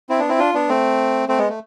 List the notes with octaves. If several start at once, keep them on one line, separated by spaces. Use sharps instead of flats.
C4 E4
B3 D4
C4 E4
D4 F4
B3 D4
A3 C4
A3 C4
G#3 B3
A3